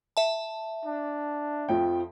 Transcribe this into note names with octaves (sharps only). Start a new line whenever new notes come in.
E5 A5
D4
F2 F3 G5